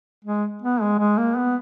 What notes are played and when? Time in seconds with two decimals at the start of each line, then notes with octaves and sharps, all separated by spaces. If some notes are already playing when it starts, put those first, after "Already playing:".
0.25 G#3
0.62 B3
0.81 G#3
0.99 G#3
1.18 A#3
1.37 B3